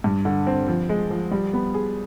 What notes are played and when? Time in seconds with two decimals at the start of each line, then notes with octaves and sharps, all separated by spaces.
0.04 G2
0.25 D3
0.47 C4
0.68 F3
0.89 G#3
1.11 F3
1.31 G3
1.53 B3
1.74 G#4